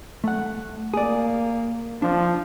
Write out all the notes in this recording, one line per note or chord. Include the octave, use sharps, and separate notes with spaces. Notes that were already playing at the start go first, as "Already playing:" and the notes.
A3 F#5
A#3 G#4 D5
F3 D4